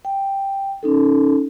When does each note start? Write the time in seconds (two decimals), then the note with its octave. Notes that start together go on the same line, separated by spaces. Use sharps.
0.05 G5
0.83 C#4 D#4 A4